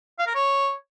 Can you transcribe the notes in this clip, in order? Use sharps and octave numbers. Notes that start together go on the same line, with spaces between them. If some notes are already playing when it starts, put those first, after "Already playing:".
F5
A#4
C#5